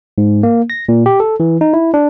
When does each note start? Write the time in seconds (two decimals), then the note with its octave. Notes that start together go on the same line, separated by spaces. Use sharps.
0.18 G#2
0.43 A#3
0.70 A#6
0.89 A#2
1.06 G4
1.20 A4
1.40 E3
1.61 D#4
1.73 E4
1.94 D4